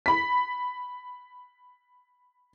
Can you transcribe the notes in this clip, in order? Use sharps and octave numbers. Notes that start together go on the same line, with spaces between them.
B5 B6